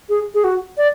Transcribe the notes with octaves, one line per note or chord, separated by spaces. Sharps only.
G#4
G#4
F#4
D5